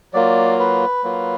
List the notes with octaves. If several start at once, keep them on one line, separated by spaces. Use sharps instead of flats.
F#3 A#3 F4 D5
B4
F#3 A#3 F4